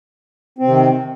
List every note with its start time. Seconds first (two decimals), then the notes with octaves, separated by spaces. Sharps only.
0.58 C4
0.63 C3
0.68 D#3